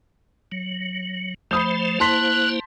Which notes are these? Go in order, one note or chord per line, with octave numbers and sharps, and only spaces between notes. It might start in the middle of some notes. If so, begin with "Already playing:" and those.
F#3
F3 A3 C5 B5 D#6 G6
A#3 E4 C5 A5 C6 F#6 B6